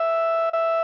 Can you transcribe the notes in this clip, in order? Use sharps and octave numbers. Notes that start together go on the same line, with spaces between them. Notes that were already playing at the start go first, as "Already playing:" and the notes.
Already playing: E5
E5